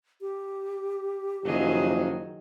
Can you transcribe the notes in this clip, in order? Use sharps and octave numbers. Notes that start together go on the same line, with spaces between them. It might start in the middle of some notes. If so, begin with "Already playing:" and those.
G4
F#1 D#3 F3 F#3 G#4